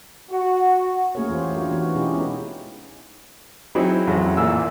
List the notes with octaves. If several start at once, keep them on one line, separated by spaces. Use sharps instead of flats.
F#4
A3 A#3 C#4 G#4 A#4 C#5
E3 F4 G4 C5
D4 F4 F#4 A#4 C#5
E3 B3 F#4
B2 G#3 C#4 D#4 E4 G4
B3 D#4 G#4
F#3 C4 D#4 E4 F#4 G#4
A1 F2 F#3 G#3 C#4
A1 A#2 A#3 G#5 E6